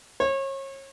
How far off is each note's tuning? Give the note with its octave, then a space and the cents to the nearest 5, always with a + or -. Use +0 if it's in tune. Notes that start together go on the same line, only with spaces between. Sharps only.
C#5 -35